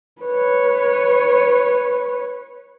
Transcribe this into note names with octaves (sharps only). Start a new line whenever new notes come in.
B4 C#5